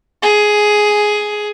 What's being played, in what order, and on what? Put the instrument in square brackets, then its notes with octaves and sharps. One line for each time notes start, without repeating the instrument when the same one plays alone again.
[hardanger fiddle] G#4